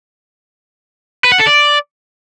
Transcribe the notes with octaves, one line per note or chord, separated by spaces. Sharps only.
B4
F#5
A4
D5